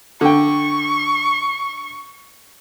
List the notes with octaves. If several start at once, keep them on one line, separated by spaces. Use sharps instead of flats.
D3 G5 C#6